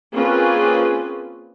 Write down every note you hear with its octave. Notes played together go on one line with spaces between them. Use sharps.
A#3 C4 C#4 F4 G#4 B4